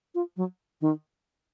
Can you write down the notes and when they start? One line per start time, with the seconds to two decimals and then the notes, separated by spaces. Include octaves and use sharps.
0.15 F4
0.37 F#3
0.81 D#3